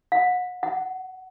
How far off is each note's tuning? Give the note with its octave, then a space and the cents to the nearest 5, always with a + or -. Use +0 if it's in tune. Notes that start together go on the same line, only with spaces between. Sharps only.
F#5 -35
F#5 +15